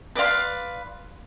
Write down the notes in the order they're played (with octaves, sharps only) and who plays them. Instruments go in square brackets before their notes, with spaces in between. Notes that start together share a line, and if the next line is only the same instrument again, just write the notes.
[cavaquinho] B4 D5 F5 C6